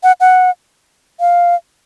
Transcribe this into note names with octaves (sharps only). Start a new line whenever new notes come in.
F#5
F#5
F5